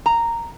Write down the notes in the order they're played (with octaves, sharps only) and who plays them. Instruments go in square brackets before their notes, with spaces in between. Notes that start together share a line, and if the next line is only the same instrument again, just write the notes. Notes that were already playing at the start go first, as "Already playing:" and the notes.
[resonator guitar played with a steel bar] A#5